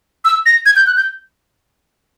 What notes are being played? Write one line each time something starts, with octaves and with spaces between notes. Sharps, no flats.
E6
A#6
G#6
G6
F#6
G6